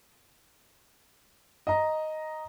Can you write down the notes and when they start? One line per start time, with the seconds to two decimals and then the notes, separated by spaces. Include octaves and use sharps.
1.67 D#5 A#5